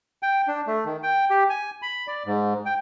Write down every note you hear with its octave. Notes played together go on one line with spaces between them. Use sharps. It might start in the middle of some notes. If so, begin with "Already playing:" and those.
G5
D4
A3
D#3
G5
G4
G#5
B5
D5
G#2
G5